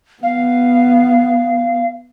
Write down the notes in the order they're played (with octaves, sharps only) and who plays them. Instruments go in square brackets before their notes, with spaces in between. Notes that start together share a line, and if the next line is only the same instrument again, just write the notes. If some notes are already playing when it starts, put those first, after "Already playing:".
[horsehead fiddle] B3 [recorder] F5